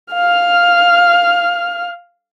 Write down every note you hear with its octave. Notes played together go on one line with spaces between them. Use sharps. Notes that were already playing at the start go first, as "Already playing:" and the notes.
F5 F6